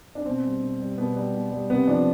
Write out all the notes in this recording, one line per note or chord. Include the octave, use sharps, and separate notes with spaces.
D4
B2 C4
G3
B2
G3
B2 B3
G3
B2
G3
C3 B3
F3 D4